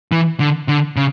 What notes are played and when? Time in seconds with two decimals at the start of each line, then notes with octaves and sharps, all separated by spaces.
0.12 E3
0.40 D3
0.69 D3
0.97 C#3